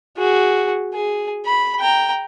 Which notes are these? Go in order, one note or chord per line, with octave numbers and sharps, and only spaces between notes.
F#4 G#4
G#4
B5
G5 A#5